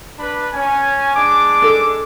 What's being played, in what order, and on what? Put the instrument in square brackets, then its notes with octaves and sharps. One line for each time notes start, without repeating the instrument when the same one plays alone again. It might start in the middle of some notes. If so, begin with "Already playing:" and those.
[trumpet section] D4 B4 B5
C#4 G#5
G#3 D4 D6
[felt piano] A4